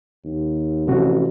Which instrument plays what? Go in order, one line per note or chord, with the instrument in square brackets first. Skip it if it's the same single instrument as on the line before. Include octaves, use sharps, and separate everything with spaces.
[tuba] D#2
[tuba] A1 [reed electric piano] C3 F3 F#4